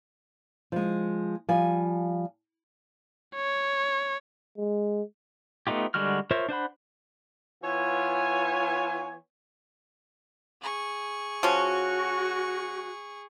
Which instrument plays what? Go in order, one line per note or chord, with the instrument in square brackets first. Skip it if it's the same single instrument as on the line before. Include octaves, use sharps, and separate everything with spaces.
[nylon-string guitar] F3 G#3
F3 G3 G#5
[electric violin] C#5
[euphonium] G#3
[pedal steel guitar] A3 B3 D#4 F4 G4
D3 G3 G#3 F#4 F6
F4 A#4 C5 C#5 E5
D4 C5 F#5 B5
[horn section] E3 B3 F4 C#5 G#5
[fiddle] G#4 C#6
[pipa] F3 C#4 [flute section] F#4